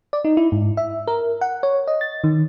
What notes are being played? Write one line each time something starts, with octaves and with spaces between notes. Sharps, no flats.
D5
D#4
E4
G#2
E5
A#4
F#5
C#5
D#5
A6
D#3